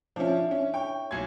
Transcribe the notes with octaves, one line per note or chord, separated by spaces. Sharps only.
F3 C#4 D4 E4
C#4
C#5 G5
B1 G#5 G#6 C7 C#7